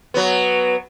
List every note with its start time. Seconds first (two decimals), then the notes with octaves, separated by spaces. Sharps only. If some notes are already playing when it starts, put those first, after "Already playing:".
0.14 F#3 B3